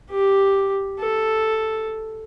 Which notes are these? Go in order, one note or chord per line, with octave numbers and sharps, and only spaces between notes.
G4
A4